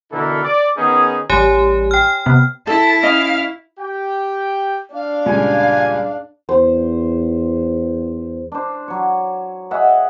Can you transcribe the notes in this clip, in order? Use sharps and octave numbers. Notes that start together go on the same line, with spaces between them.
B2 D3 E3 E4 A4 A#4
D5
D#3 B3 C#4 D#4 G#4
A1 G3 G4 C#5 G#5
G5 F6
C3 B3
E4 A4 A5
C#4 D#5 F5
G4 G5
D4 F5
C#2 G2 A#2 G#5
E2 C5
D4 C5
F#3 C#5
G#4 D#5 E5 F#5